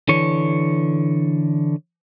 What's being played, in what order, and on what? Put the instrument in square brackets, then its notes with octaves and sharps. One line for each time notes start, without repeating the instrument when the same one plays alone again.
[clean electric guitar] D3 E3 C#5